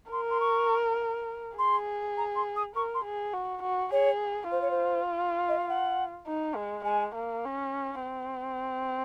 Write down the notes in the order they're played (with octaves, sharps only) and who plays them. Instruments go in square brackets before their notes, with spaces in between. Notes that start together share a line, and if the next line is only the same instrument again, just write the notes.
[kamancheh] A#4 [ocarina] C6
[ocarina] C6
C#6
[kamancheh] G#4 [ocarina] C6
[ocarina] A#5
C6
D#6
[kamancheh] A#4 [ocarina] C#6
[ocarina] C6
[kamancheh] G#4
F#4
F#4
[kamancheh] G#4 [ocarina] C#5
[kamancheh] F4 [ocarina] C5
[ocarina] C#5
C5
D#5
F5
F#5
[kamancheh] D#4
G#3
[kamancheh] G#3 [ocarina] G#5
[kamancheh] A#3
C#4
C4